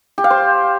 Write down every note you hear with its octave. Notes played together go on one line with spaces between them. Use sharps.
G4
F5
C5